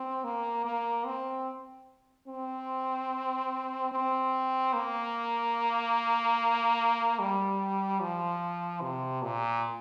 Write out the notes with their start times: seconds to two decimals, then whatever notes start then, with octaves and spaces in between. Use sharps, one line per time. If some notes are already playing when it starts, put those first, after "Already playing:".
Already playing: C4
0.24 A#3
0.65 A#3
1.06 C4
2.28 C4
3.92 C4
4.73 A#3
7.19 G3
8.00 F3
8.81 C3
9.22 A#2